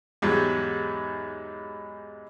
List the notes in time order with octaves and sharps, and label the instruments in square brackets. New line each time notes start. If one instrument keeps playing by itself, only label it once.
[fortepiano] E2 G#2 F#3 [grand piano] G#3 G4